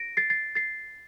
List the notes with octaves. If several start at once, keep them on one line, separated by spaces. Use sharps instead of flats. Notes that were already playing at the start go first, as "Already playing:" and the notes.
Already playing: A#6 D7
A6 C7
A6 C7
A6 C7